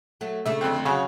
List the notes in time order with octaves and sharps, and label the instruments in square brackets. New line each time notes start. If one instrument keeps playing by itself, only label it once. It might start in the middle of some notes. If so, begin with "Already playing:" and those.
[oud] F#3 A3
[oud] C#3 A3 D4 [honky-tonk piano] E5
[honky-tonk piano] F2 D3 C4
[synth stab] C#3 [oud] F#3 [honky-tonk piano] F#4 C#5